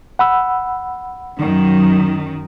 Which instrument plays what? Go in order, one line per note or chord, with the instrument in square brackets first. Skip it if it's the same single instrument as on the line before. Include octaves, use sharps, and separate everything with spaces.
[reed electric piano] F#5 B5 E6
[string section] F#2 D#3